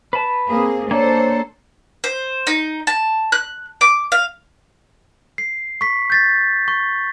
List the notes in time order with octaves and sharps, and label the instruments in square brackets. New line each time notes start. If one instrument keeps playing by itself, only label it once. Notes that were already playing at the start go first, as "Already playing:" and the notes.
[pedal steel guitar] B4 A5
[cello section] A#3 C4 G#4
[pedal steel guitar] A#3 D4 G#5 [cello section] A4 C5 C#5
[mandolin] C5
D#4
A5
F#6
D6
F5
[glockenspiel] C7
C#6 B6
G6 A6 B6
C#6